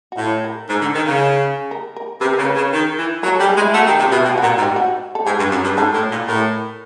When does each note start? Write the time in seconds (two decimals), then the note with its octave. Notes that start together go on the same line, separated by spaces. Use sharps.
0.12 F#4
0.18 A2 F4
0.44 A#4
0.69 G#2
0.81 D3
0.95 D#3
1.07 C#3
1.71 A#4
1.96 A#4
2.21 C3 B4
2.33 A#4
2.39 C#3
2.45 B4
2.56 C#3
2.73 D#3
2.98 E3
3.23 F#3 A#4
3.36 A4
3.40 G3
3.49 G#4
3.57 G#3
3.62 E4
3.74 A3 F#4
3.86 D#3 G4
3.99 C3 F4
4.12 B2 E4
4.25 B2 G4
4.31 F4
4.38 F#4
4.42 A#2
4.50 F#4
4.58 G#2
4.62 G4
4.76 F#4
5.15 A4
5.26 G#2 G#4
5.39 G2
5.52 F#2
5.64 G2
5.77 G#2 A4
5.94 A2
6.10 A#2
6.27 A2 A#4